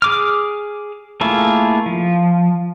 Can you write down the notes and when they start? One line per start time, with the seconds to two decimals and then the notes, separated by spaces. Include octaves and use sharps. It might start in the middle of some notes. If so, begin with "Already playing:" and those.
0.02 G#4 D6 F6
1.21 A3 A#3 E4 F4 G#4
1.86 F3